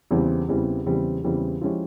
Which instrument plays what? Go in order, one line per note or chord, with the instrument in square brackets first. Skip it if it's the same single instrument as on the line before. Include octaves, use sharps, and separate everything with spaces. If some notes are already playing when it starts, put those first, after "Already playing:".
[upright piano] E2 C#3 E3 G3 C4
E2 C#3 E3 G3 C4
E2 C#3 E3 G3 C4
E2 C#3 E3 G3 C4
F3 G#3 C#4 E4 G4